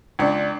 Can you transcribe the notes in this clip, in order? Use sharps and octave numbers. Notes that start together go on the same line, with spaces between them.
C#2 D4